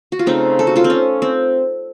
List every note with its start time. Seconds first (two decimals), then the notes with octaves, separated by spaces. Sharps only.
0.12 F#4
0.19 F4
0.26 C#3 A3 C4 D#4
0.59 A4
0.67 F#4
0.76 F4 A4
0.84 C4
0.90 C#4
1.22 C4